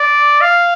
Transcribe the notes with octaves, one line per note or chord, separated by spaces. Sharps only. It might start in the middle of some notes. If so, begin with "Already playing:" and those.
Already playing: D5
F5